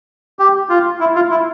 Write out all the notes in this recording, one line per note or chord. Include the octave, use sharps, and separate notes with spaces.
G4
F4
E4
F4
E4